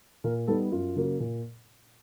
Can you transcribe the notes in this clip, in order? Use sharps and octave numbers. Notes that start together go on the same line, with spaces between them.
A#2 A#4
G3 B3 D#4 A4
F#2 F4
C#3 F#3 A#3
A#2